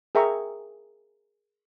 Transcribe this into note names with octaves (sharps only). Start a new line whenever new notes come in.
G#4 A#4 E5 G5 A#5 C#6